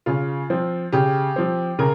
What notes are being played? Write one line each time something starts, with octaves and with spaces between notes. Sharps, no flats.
C#3 F4
F3 C4
C#3 G4
F3 C4
C#3 A#4